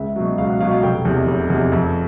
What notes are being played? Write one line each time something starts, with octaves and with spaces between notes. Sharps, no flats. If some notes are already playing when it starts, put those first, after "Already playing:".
Already playing: C#2 E5
B2 F#3
C#2 F5
F#5
B2 F#3 F5
F5
F1 G5
E2 C3
F1
E2 C3
F2